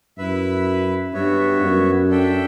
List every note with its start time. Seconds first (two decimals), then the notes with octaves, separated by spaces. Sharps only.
0.18 F#2 E4 B4 E5
1.13 G2 B3 F#4 C#5 E5
1.62 F#2
2.09 D4 A4 E5 G5